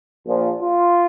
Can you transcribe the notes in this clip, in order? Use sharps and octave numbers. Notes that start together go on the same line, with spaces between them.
A#1 A#2 F3
F4